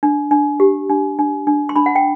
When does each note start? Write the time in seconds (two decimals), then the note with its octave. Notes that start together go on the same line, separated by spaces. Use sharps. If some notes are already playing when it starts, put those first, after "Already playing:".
0.03 D4
0.31 D4
0.60 G4
0.90 D4
1.19 D4
1.47 D4
1.69 C6
1.76 D4 B5
1.86 F#5
1.96 G5